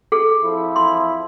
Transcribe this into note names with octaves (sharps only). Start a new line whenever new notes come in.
G#4 A4
F2 F3 E4
C6